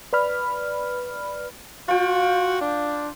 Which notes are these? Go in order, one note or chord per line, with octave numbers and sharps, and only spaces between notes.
B4 D5 B5 F6
F4 F#4 G5
D4